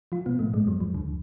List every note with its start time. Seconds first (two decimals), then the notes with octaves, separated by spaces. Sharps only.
0.12 F3 F4
0.26 B2 B3
0.39 A2 A3
0.53 G#2 G#3
0.67 F#2 F#3
0.80 F2 F3
0.95 D2 D3